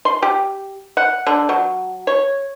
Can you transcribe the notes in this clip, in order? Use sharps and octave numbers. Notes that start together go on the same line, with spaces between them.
C6
G4
F#5
D3
F#3
C#5